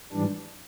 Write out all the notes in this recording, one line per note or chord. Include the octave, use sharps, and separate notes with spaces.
G#2 E3 G3 D4